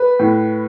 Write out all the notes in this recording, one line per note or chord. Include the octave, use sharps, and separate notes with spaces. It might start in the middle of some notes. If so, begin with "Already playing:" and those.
Already playing: B4
A2